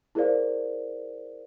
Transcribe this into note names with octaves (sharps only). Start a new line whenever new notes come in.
E4 G#4 A#4 C5 D5 F5